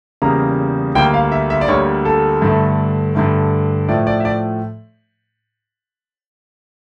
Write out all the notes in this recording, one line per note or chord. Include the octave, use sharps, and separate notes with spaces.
E2 C#3 G3 A#3 A#5
D2 D3 G3 A#3 G5
F5
E5
E5
D5
D2 D3 G3 A#3 C#5
A4
G2 D3 A3
G2 D3 A3
A2 F3 A3 D5
D5
E5
D5